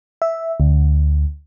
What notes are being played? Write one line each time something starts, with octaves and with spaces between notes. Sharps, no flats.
E5
D2